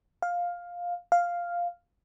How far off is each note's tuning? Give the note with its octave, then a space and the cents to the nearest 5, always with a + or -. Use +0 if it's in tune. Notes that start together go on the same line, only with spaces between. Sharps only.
F5 +10
F5 +0